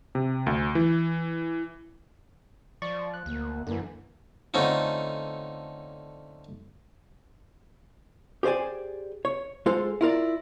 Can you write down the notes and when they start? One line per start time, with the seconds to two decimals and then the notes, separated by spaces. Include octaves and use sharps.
0.15 C3
0.47 D2
0.75 E3
2.82 F3 D5 C#6
3.14 F#6
3.26 D2 A#3
3.67 F#2 D3 E3 A#3
4.54 D3 A3 C4 C#4 D#4 F4
8.43 G4 G#4 C5 D5 G#5
9.25 C#5
9.66 G#3 F4 A4 C5
10.01 E4 F4 A#4 D5